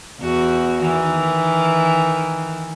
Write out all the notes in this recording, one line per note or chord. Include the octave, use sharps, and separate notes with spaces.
E2 F#4
D#3 E3